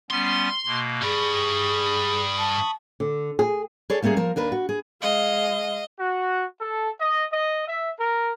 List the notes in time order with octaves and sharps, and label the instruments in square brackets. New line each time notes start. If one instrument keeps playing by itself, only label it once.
[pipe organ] G3 B3 C#4 [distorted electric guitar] C6
[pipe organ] B2 A#3
[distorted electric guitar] G2 G3 [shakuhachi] G#4 [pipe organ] B5 C#6 D#6
[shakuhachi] A5
[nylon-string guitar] D3
G#4
[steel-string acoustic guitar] G#4 A4 C#5 D5
G3 A3 A#3 C#4 G#4
F3 A#4
D#2 D4 A#4 B4
F#4
G#4
[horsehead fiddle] G#3 F5 [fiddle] D#5
[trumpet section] F#4
A4
D#5
D#5
E5
A#4